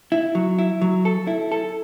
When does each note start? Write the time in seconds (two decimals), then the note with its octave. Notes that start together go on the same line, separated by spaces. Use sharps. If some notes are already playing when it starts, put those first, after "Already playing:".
0.12 E4
0.35 F#3
0.58 E4
0.81 F#3
1.05 A4
1.27 E4
1.52 A4